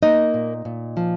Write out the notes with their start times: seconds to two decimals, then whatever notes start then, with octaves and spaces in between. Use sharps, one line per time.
0.03 A#3 D#4 D#5
0.34 A#2
0.65 A#2
0.97 F3